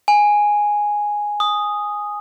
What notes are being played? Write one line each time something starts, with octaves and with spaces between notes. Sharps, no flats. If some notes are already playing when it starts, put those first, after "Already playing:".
G#5
D#6